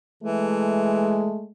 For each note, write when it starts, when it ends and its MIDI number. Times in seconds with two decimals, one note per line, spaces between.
0.23 1.31 52
0.23 1.51 56
0.23 1.48 57